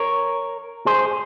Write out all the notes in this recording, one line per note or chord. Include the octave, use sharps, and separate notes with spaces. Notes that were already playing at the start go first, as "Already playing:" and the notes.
Already playing: A#4 C#5
G#4 C5